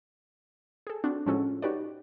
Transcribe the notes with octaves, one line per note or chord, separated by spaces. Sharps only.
G#4 A4
C4 D4 F#4
A2 F3 G#3 C#4 F#4 A4
D#4 F#4 G4 B4 C#5 D5